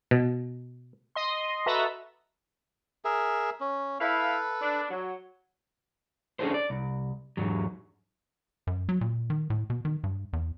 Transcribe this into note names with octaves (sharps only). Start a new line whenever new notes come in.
B2
D#5 C6
F#4 A4 B4 D#5 E5 A#5
G#4 A#4 E5
C#4
E4 A4 B4 F5
D4
F#3
C#4 D4 F4 G#4 A4 C5
D5
C2
E2 G#2 F#3
F#2
F#3
A#2
D#3
A2
B2
D#3
G2
E2